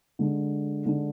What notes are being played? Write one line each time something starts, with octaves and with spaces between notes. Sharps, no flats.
D3 G#3 D4
D3 G#3 D4